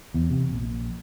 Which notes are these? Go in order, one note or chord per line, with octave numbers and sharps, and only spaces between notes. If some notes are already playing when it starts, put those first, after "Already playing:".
E2
C3
A#1